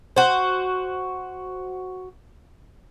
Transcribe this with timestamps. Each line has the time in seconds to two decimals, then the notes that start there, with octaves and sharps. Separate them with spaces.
0.16 F#4 C5